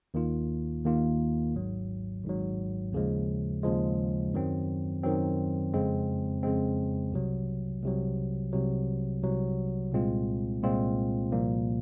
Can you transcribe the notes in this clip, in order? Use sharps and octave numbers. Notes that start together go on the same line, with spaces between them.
D#2 D#3 A#3 F4
D#2 D#3 A#3 F4
G#1 G#2 F#3
G#1 G#2 F#3
D#2 C#3 F3 G#3
D#2 C#3 F3 G#3
F#2 D#3 F#3 C4
F#2 D#3 F#3 C4
F2 C#3 G#3 C4
F2 C#3 G#3 C4
C2 C3 F#3
C2 C3 F#3
C2 C3 F#3
C2 C3 F#3
C2 A#2 G#3 C4 F4
C2 A#2 G#3 C4 F4
C2 A#2 F3 A#3